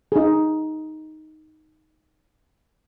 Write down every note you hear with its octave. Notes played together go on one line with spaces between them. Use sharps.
D#4 G#4